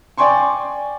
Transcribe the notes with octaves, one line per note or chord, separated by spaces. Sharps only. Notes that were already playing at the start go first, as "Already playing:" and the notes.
D5 G5 G#5 C6 C#6